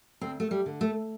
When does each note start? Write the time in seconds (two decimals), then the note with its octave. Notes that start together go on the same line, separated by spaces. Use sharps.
0.21 D2 C4
0.40 A3
0.51 G3
0.66 D3
0.81 A3